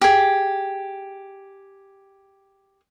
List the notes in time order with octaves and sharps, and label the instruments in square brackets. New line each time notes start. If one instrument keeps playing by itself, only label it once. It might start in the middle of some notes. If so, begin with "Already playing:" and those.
[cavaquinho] G4 G#4